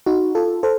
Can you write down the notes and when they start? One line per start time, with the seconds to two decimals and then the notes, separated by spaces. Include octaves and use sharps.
0.06 D#4 F#4
0.35 F4 A4
0.63 A4 C5